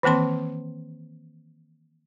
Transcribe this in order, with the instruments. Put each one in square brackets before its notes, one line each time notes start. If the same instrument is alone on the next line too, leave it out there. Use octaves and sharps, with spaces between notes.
[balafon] D#3 E3 A#3 C4 C6